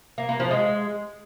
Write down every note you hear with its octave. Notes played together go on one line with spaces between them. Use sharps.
A#3
A#3
F3
G#3